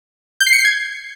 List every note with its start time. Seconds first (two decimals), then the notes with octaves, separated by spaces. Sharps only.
0.40 G6
0.47 C7
0.53 C#7
0.59 C7
0.65 G#6